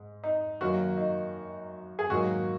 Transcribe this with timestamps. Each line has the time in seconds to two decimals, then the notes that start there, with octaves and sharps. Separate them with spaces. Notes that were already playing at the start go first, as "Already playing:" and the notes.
Already playing: G#2
0.24 D#4
0.61 F#2 D#3 F#3 A#3 F#4
0.98 D#4
1.99 G#4
2.10 G#2 D#3 F#3 A#3 F#4